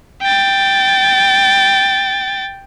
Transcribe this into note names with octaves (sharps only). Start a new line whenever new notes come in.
G5 A6